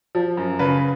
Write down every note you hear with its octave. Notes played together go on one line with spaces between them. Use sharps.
F3
F#2
C#3 B4